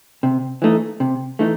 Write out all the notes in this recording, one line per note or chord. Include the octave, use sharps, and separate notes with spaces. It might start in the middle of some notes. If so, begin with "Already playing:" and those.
C3
E3 A3 D#4
C3
E3 A3 D#4